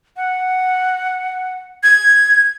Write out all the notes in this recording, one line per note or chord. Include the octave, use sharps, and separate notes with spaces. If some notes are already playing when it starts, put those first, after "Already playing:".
F#5
G#6